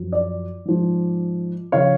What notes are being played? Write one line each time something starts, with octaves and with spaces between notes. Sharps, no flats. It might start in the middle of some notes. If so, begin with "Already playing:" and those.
Already playing: F#2 F3
D5
G#2 F3
C#3 F3 C#5 F5